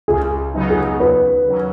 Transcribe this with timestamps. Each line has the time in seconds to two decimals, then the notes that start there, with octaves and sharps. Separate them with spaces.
0.08 C#2 G#4
0.54 C#3 F#3 B3 D#4
0.70 G#4
1.00 D#2 B4
1.46 C#3 F#3 C#4